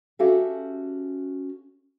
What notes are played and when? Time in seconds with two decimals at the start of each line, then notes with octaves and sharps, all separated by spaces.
0.19 C#4 F#4 G4 A4 E5 F5